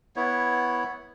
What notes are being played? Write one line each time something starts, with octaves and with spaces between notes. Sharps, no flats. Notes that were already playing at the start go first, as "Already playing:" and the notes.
B3 E4 C#5